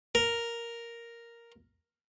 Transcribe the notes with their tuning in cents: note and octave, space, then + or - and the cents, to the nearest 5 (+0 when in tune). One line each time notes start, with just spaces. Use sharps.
A#4 +0